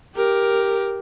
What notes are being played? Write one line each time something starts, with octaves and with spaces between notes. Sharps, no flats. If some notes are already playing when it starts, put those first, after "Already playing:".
G4 A#4